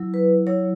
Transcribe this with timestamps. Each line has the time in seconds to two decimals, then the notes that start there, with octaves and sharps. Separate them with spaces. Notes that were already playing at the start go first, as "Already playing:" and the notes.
Already playing: F#3 E4
0.14 B4
0.47 F#3 E4 C#5